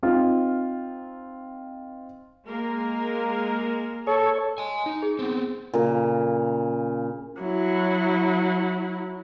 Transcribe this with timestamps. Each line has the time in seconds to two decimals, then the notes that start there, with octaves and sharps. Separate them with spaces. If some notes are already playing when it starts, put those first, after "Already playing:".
0.03 C4 D#4 F4
2.47 G#3 A#3 A#4
4.07 A4 C#5
4.58 D#5 G#5
4.86 D#4
5.03 G#4
5.19 B3 C4
5.74 A#2 C#3 A#4
7.41 F#3 E4